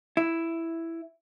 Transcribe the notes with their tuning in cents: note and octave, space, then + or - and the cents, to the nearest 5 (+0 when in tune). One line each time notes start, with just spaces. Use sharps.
E4 +5